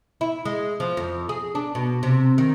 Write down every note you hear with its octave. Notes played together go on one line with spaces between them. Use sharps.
E4
G#3
F3
F2
G#4
D4
B2
C3
D#3